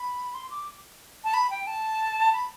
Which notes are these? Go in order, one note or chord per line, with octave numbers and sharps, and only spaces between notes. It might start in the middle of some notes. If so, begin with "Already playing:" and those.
Already playing: B5
C6
D6
A5
B5
G5
A5
B5